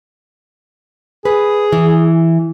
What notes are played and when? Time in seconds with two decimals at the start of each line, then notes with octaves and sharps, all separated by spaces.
1.25 G#4 B4
1.72 E3